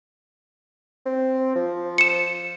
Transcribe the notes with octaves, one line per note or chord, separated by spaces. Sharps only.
C4
F3
C#7 E7